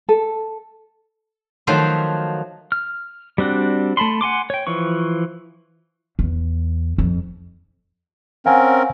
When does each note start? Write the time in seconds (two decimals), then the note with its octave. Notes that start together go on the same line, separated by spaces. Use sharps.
0.09 A4
1.67 D#3 F3 F#3 A3 C5 C6
2.72 F6
3.38 G3 C4 D4 F#4
3.97 A3 A5 B5 C6
4.21 F#5 G#5 C6 D6
4.50 C#5 G5
4.67 E3 F3 C#6
6.19 E2
6.98 F2
8.46 C4 C#4 A#4 F5 F#5 G#5